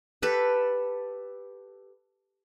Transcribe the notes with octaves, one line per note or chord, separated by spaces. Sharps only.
G4 A4 B4